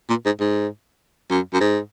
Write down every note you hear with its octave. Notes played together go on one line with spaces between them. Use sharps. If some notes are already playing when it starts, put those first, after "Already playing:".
A#2
G#2
G#2
F#2
F#2
G#2